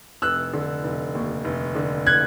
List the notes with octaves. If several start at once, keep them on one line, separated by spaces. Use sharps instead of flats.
F1 E6 F#6
D3
F1
D#2
F1
D3
F#6 G#6